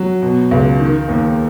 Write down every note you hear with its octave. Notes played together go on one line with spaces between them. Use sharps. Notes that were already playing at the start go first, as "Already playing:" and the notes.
Already playing: F#3
B2
C#2
D#3
D#2